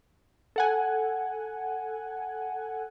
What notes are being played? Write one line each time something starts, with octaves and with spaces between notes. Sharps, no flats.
A4 F#5 G#5